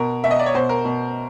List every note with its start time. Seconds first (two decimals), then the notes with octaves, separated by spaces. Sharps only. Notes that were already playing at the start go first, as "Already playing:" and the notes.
Already playing: B2 A#4
0.24 B2 E5
0.31 D#5
0.39 D5
0.46 C#5
0.54 B2 C5
0.69 A#4
0.85 B2